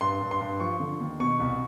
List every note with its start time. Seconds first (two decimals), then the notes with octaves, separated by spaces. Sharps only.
0.01 G2 C6
0.21 G2
0.31 C6
0.41 G2
0.60 F3 C#6
0.80 D3
1.00 D#2
1.20 B2 C#6
1.40 C2